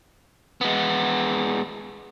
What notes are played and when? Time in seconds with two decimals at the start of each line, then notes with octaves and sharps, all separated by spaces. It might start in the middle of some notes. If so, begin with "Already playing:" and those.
0.61 G#3 B3